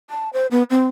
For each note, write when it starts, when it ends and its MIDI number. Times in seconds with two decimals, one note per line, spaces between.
0.10 0.29 81
0.33 0.47 72
0.51 0.63 59
0.70 0.88 60